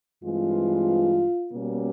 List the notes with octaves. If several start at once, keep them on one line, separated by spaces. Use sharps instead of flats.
G2 E3 G#3 C4 F4
B2 G3 A#3 C#4